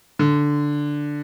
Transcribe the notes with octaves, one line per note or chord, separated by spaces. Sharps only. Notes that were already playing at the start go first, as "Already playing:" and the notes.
D3